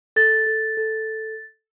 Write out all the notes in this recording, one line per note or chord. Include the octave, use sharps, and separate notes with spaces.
A4 A6
A4
A4